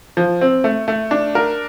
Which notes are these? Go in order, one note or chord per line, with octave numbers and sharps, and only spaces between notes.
F3
C4
A3
A3
D4
A#4